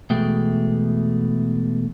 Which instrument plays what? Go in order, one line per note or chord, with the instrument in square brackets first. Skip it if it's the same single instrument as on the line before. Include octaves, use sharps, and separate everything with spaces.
[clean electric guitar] E2 B2 G#3 A3 G5